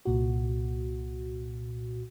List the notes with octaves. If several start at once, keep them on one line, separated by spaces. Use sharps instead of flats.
C2 A#2 F#4